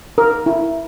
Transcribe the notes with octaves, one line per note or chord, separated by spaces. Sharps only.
A#4
E4